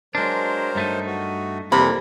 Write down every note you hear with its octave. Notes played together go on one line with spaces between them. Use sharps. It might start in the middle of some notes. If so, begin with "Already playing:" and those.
F#3 G#3 D4 A#4 C5
G2 A3 D#4
F#4
F2 C3 E3 G3 A#3 B5